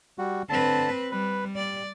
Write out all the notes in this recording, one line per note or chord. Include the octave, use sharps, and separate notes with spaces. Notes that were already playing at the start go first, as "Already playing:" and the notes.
G3 F#4
D3 C4 B4 A5
G3 B4
G3 D5